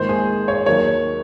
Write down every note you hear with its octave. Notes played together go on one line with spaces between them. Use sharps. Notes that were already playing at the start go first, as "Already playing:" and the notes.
Already playing: A#1 G#2 D#3 C5
G#4
C#5
D#2 D#3 F#3 C#5